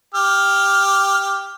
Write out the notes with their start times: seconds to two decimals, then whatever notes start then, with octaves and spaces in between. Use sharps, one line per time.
0.15 G4 F6